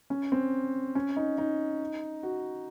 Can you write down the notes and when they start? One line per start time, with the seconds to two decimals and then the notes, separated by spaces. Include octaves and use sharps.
0.10 C#4
0.32 C4
0.95 C#4
1.16 D#4
1.38 D#4
2.23 F#4